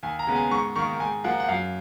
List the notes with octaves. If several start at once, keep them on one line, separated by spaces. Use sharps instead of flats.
D#2 G#5
A#5
C#3 G#3 B3
G#5
G#2 C#6
D#3 A#3 C#6
G#2 G#5
F3 A#3 F#5
F#5
F#2 F5